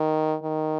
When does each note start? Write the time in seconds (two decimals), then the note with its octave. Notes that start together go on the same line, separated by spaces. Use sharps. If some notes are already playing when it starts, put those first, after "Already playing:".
Already playing: D#3
0.43 D#3